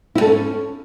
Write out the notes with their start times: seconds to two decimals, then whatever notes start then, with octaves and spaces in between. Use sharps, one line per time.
0.15 E4
0.21 A4
0.27 C#4